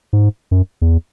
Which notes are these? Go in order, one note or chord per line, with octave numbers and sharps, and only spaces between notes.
G#2
F#2
E2